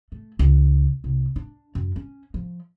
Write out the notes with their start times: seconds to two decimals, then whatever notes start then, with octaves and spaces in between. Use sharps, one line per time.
0.12 A3
0.39 C#2
1.04 C2
1.36 D4
1.75 F#2
1.96 C#4
2.34 F3